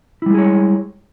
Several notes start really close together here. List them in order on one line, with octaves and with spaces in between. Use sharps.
E4 G3 G#3 G#4 C#5